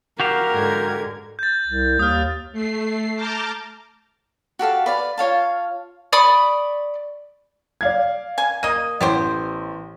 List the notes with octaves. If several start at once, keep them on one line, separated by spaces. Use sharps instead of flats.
F#4 G4 A#4 F5
G#2 D3 G#6
G6 A6
C2
D#2 D#6 F6
A3 C7
A5 A#5 D6 F6 G6 A6
F#4 G4 A4 F5
B4 D5 F5
F4 C#5 F5 A5
D5 B5 C#6 D#6
D5 F5 G#6
G#5
A#3 D#5 D#7
A1 B3 G4 C5